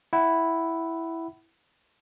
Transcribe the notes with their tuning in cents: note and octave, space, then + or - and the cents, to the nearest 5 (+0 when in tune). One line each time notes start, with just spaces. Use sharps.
E4 +0 F#5 +25